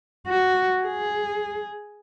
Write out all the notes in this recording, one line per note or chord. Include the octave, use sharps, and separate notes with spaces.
F#4
G#4